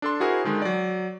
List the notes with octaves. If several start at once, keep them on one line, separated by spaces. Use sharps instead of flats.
D4 A4 C6
E4 F#4 G#4 A#4 C5
D3 D#3 G#3
F#3 D5